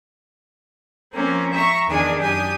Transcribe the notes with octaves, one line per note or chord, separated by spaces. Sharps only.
F3 A#3 C4 C#4
E5 A#5 C#6
E2 D#3 D4 G#4 G#5 D#6
F#2 D4 G4 G#5 D#6